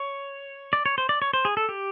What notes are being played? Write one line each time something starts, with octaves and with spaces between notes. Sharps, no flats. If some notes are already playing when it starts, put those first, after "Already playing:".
Already playing: C#5
D5
C#5
C5
D5
C#5
C5
G#4
A4
G4